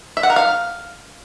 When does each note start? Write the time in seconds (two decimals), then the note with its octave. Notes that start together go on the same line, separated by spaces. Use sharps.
0.17 E5
0.23 F#5
0.30 A#4
0.36 F5